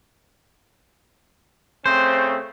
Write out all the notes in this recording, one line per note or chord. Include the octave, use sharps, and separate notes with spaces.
C#3 A3 C4 C5